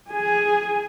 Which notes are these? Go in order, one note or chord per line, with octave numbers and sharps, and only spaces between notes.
G#4 G#5